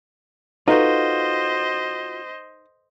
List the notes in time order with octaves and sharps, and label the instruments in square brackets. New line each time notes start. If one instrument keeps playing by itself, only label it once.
[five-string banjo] D#4 [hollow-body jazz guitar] F4 F#4 [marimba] A4 B4 [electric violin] C5 D#5